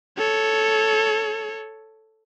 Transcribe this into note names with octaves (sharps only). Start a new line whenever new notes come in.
A4 C#5